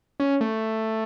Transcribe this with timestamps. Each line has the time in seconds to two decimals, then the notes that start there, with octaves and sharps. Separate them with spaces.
0.20 C#4
0.41 A3